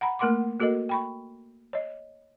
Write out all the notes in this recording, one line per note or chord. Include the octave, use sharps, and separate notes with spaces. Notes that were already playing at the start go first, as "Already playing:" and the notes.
F#5 A#5 B5
A3 A#3 A#4 F#5 C6 D6
A#3 F#4 A4 A#4 D#5
G5 B5 C#6
C#5 D#5